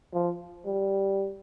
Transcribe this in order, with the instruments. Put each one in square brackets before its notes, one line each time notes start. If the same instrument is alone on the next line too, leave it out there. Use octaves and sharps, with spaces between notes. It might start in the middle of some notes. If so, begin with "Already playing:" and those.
[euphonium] F3
G3